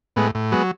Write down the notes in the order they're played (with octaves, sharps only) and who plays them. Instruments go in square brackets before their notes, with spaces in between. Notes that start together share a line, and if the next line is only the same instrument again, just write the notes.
[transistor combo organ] A2 G#3 B3
A2
F#3 G#3 B3